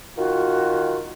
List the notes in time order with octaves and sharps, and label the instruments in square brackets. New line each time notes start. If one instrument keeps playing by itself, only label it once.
[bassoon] D#3 [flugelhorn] F4 [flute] F#4